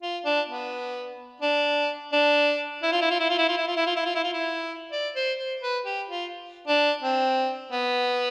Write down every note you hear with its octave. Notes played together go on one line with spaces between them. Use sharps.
F4
D4
B3
D4
D4
E4
F4
E4
F4
E4
F4
E4
F4
E4
F4
E4
F4
E4
F4
E4
F4
E4
D5
C5
C5
B4
G4
F4
D4
C4
B3